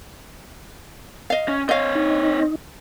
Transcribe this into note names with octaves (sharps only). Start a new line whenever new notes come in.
D#5 F5
C#4
C4 C#5 D#5 F5
D#4